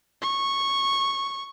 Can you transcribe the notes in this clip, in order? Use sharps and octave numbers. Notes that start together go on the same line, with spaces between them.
C#6